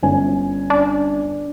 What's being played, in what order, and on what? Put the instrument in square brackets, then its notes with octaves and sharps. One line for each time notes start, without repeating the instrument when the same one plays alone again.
[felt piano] G1 C#4 G#5
[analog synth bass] D4